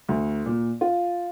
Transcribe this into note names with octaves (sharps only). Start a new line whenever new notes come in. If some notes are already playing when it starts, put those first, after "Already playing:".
D2
A#2
F4